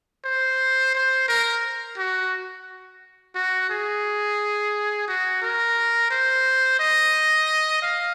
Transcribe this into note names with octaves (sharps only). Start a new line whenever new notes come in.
C5
C5
A#4
F#4
F#4
G#4
F#4
A#4
C5
D#5
F5